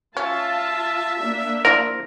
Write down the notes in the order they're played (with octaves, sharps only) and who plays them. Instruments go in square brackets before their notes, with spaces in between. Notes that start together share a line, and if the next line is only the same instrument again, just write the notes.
[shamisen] C#4 [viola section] F4 A5 [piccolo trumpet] E5
[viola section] A#3 D4
[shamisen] F3 E4 D5 [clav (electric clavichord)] A#4